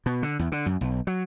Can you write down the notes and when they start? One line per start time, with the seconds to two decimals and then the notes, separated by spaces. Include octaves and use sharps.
0.06 B2
0.23 D3
0.39 E2
0.52 D3
0.66 F#2
0.81 B1
1.07 F#3